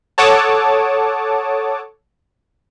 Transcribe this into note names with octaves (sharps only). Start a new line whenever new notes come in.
A4 C#5 F#5 A5 D6 D#6